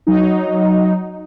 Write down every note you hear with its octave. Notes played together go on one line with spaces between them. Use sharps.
F#3 D#4